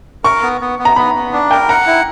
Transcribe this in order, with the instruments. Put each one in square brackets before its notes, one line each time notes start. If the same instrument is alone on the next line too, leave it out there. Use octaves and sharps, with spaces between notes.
[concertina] A#4 [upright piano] C#6
[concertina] B3
B3
B3
[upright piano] A#5
[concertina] B3 [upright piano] B5
[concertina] B3
D4
[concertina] A#4 [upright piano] G5
[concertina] F#5 [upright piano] A#5
[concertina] E4